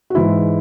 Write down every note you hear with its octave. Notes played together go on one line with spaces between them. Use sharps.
F#4
G#2 E3 G#3 E4